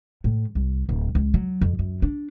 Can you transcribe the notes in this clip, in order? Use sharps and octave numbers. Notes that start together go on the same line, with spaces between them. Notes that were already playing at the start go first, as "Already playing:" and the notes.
A2
C2
D1
C#2
F#3
F2
F#2
D4